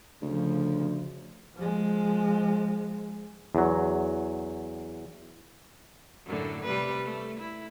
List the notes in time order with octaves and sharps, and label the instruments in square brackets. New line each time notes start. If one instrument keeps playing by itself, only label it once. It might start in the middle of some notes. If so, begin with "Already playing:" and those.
[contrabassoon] D2 [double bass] C#3 F3
[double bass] F3 G#3
[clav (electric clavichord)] E2 F#3
[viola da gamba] F#2 A2 D3
C3 G3 B4
A3
E4